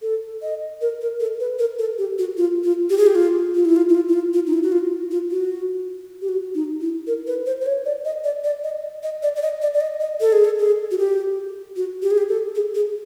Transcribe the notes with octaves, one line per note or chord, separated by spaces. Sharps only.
A4
D#5
A#4
A#4
A4
B4
A#4
A4
G4
F#4
F4
F4
G4
G#4
G4
F4
F4
E4
F4
E4
F4
E4
F4
F4
D#4
E4
F#4
F4
F4
F#4
G4
F#4
D#4
E4
A#4
B4
C5
C5
C#5
D5
D#5
D5
D5
D#5
D#5
D5
D5
D#5
D5
D5
D#5
D#5
A4
G#4
A4
G#4
F#4
G4
F#4
G4
G#4
G4
A4
G#4
G#4